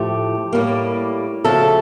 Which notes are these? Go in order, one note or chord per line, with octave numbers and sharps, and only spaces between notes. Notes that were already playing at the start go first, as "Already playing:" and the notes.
Already playing: A2 F3 A3 G4
A2 G3 A#3
D2 C#3 F3 A3 A4